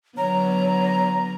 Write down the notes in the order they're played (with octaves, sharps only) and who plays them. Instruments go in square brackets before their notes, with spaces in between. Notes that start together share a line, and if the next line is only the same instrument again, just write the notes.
[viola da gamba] D3 F#3 B3 [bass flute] C#5 [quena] A#5